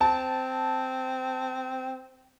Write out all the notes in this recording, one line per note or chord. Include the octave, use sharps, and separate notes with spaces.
C4 A5